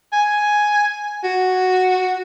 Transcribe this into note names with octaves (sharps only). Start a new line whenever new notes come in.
G#5
F#4